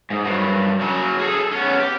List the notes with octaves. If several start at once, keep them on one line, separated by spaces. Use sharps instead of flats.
G#2
G2 F#3
C#3 F#3
G#4 A4
B3 C#4
G4